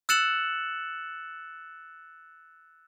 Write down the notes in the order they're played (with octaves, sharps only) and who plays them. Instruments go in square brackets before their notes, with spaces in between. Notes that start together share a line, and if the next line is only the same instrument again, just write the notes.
[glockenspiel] E6 F#6 A6 C#7 E7 F#7